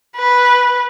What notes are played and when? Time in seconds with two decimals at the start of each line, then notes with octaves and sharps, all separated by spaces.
0.17 B4